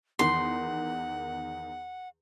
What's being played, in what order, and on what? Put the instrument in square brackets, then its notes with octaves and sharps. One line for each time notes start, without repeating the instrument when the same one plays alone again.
[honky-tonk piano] E2 D#3 [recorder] F#5 [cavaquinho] C6